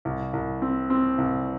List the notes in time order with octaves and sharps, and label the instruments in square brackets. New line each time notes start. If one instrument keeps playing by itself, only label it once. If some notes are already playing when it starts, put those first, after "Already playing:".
[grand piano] C2
C2
C4
C4
C2